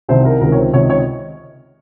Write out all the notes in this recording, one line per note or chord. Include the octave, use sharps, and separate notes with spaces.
C2 C3 D#3 C5
A#4
C#2 C3 D#3 A#4
C#5
C5
C#2 C3 D#3 C#5
D#5
C#5
D#5